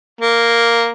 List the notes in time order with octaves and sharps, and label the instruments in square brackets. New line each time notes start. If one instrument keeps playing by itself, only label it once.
[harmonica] A#3